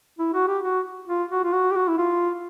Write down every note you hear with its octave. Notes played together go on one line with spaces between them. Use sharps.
E4
F#4
G4
F#4
F4
F#4
F4
F#4
G4
F#4
E4
F4